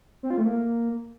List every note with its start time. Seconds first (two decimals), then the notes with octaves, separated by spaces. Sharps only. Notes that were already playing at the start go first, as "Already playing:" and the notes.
0.23 C4
0.30 F4
0.38 A3
0.45 A#3